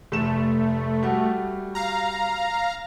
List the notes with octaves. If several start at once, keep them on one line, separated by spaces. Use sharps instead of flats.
F1 A3 E7
G3 F#4
F5 A#5